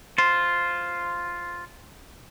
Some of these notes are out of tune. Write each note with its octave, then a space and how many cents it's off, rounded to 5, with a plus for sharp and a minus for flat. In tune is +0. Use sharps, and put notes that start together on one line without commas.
F4 +0 C5 +0